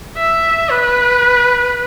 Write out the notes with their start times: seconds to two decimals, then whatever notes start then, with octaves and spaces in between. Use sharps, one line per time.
0.17 E5
0.70 B4